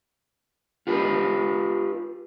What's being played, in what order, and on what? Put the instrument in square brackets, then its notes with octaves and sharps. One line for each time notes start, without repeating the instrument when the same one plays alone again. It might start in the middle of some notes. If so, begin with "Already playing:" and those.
[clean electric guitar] F4 G4 B4